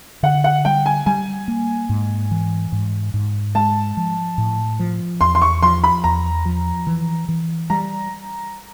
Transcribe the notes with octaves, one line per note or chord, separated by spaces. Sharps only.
D3 F#5
F#5
G3 G5
G#5
G3 G#5
A#3
G#2
E3
G#2
G#2
G#3 A5
F3
A2
F3
E2 C6
C6
C#6
F3 C6
B5
E2 A#5
F3
E3
E3
G3 A#5